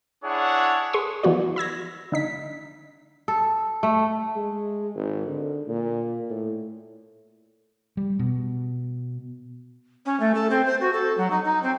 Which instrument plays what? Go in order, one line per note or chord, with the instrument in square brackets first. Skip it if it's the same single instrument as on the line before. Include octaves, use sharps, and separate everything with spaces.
[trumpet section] D4 E4 G#4 C#5 F#5
[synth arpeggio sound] G#4 C6 C#6 D#6
E3 F3 B3 F#4 D5
B5 E6 G#6 A#6
D3 D#4 B6
[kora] A4
A3
[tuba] G#3
G#1
D3
A#2
A2
[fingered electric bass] G3
B2
[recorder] C#4
A3
A4
C4
C5
F#4
A4
F#3
D#4
D#4
C4